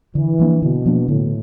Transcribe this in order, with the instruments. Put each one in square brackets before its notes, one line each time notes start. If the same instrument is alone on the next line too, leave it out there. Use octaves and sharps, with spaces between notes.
[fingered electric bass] D3 [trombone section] E3
[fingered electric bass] F3 A#3 D4
[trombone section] B2 [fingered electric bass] D3
[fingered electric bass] F3 A#3 D4
[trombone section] A2 [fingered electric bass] D3